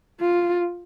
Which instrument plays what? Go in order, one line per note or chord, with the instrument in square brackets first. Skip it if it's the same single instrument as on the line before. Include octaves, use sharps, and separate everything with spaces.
[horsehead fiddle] F4